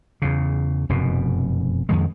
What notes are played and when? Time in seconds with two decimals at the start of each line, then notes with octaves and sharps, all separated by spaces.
0.22 E2 C#3
0.89 F1 F#2 B2
1.89 F2 D#3 G#3